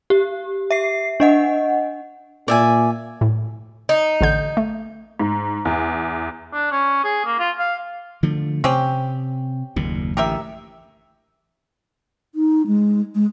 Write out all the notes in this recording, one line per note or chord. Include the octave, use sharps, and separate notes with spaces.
G4
E5 C7
D4 D#5 F#5
A#2 D5 E5 G#5
A2
D#4
A1 D3 G6
A3
G#2
E2
D4
C#4
G#4
A#3
F4
F5
D3 F3 A3
C3 C4 C#4 G4
F#1 D#2 A#2
A1 D3 G4 A#4 E5
D#4
G#3
G#3